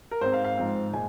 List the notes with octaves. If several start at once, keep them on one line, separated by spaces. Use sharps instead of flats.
A#4
G#2 G#3 C4 C5
F5
F5
G#2 F3 G#3 C4
A#2 G#3 G#5